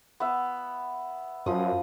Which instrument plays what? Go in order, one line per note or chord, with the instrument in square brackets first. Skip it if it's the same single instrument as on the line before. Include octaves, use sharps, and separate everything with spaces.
[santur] B3 E5
[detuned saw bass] F#2 [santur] F3 D#6